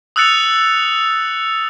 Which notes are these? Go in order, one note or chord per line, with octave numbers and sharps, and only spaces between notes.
D#6 E6 F#6 A6 C#7 F7